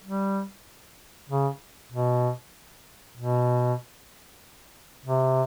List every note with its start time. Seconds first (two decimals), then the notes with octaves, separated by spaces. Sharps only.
0.04 G3
1.29 C#3
1.92 B2
3.17 B2
5.05 C3